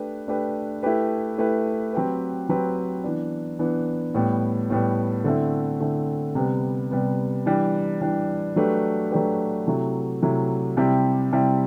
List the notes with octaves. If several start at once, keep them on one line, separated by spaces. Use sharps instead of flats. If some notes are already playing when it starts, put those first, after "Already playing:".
Already playing: A3 D4 G4 B4
A3 D4 G4 B4
A3 E4 G4 B4
A3 E4 G4 B4
F#3 C4 G4 B4
F#3 C4 G4 B4
E3 B3 D4
E3 B3 D4
A2 G3 B3
A2 G3 B3
D3 A3 C4 E4
D3 A3 C4 E4
C3 G3 B3
C3 G3 B3
E3 G3 D4
E3 G3 D4
F#3 A3 D4 G4 B4
F#3 A3 D4 G4 B4
C3 F#3 A3 E4
C3 F#3 A3 E4
C3 G3 C4 E4 G4
C3 G3 C4 E4 G4